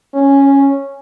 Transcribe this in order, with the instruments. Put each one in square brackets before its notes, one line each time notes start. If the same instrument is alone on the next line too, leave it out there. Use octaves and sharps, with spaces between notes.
[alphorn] C#4